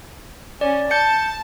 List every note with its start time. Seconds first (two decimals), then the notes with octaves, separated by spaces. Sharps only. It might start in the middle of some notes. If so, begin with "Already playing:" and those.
0.61 C#4 D5
0.91 A5 G6 C#7